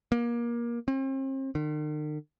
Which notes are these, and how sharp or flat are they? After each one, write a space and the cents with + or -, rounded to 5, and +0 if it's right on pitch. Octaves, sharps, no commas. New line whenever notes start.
A#3 +25
C4 +40
D#3 -45